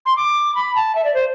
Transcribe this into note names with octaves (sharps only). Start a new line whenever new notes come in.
C6
D6
B5
A5
E5
D5
C5